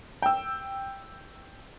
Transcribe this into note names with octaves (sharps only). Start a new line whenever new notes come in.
G5 E6